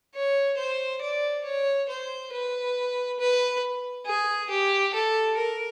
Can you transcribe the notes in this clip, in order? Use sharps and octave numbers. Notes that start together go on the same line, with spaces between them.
C#5
C5
D5
C#5
C5
B4
B4
G#4
G4
A4
A#4